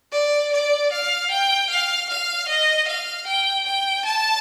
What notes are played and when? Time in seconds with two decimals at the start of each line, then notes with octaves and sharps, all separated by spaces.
0.12 D5
0.52 D5
0.92 F5
1.31 G5
1.69 F5
2.09 F5
2.48 D#5
2.87 F5
3.26 G5
3.66 G5
4.05 A5